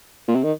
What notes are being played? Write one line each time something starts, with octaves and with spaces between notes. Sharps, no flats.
A#2
C3
D#3